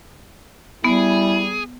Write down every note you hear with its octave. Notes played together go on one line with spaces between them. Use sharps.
G3 B3 E4 G#4